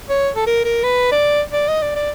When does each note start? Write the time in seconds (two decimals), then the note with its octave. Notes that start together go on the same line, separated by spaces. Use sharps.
0.10 C#5
0.36 A4
0.47 A#4
0.65 A#4
0.84 B4
1.12 D5
1.53 D5
1.68 D#5
1.82 D5
1.96 D5